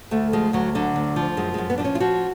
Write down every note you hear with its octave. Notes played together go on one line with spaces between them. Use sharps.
D2 A3
F3 G#3
D2 F#3
D3 F#3
D2
F3
F#2 G#3
F#2 G#3
B3
F3 D4
C#4
F4
F3 F#4